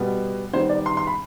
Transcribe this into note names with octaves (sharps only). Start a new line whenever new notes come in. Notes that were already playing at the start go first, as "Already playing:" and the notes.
Already playing: B2 G3 B3
D#3 G3 B3 C5
D5
C6
C6
B5